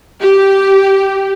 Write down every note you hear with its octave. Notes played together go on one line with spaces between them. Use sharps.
G4